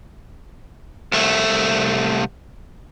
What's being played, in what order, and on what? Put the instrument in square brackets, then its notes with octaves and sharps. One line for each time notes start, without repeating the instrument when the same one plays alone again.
[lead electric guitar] C2 A3